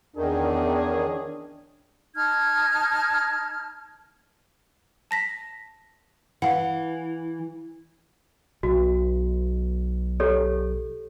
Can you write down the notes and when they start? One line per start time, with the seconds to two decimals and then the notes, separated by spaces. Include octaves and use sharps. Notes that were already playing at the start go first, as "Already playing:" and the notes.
0.16 E2 D#3 C#4 D4 G#4
2.15 D#4 A5 F6 G#6
5.11 A5 A#6 B6
6.42 E3 F5 F#5
8.63 B1 F#4
10.20 G4 A4 C#5